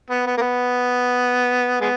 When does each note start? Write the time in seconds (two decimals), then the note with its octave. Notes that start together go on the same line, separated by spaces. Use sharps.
0.10 B3
0.26 B3
0.37 A#3
0.41 B3
1.81 G#3 B3